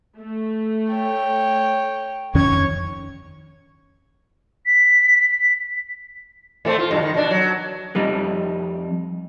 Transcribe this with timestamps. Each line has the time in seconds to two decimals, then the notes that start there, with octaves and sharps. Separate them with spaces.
0.19 A3
0.90 C#5 G5
2.35 F2 D#3 C#4 C#5 C#6 G#6
4.66 B6
6.65 A2 A3 C4
6.79 F4
6.90 E2 G2 B2
7.03 D#3
7.14 B2 D4
7.31 F#3
7.95 F2 G3 D#4